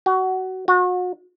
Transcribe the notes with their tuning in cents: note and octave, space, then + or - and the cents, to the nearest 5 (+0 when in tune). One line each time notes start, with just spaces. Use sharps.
F#4 +20
F#4 -35